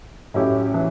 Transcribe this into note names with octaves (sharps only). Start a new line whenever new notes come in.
A2 F#3 C#4 E4 G4
E3